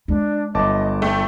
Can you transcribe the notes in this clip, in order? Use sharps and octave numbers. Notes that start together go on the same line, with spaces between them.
G#3 D4 E4
G1 F#3 D#5 A5 D6
A3 G5